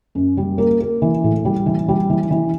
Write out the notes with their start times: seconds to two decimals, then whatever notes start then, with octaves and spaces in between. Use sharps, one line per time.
0.15 F#2
0.37 G3
0.58 A#3
0.81 A#3
1.02 E3
1.24 A2
1.45 G3
1.66 E3
1.88 G3
2.10 E3
2.31 E3